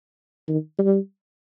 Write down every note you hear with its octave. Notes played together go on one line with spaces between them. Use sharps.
D#3
G3